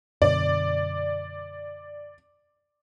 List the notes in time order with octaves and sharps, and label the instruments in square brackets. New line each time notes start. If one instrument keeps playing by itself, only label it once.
[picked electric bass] F#2 B2 D3 [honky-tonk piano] D5